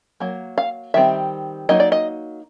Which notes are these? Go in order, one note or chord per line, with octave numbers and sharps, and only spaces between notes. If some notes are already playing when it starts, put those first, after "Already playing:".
F#3 A#3
F5
D#3 G3 C4 E5
F#3 A#3 D#4 D#5
D5
D#5